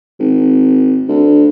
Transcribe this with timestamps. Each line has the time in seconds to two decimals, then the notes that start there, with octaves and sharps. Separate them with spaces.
0.20 G#1
1.09 D2